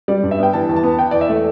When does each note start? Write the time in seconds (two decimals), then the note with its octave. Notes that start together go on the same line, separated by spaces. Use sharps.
0.08 G3 D5
0.23 G2
0.31 E5
0.39 B3 G5
0.53 E3 A5
0.69 E2
0.76 A5
0.83 B3
0.98 E3 G5
1.11 E2 D5
1.21 E5
1.29 A3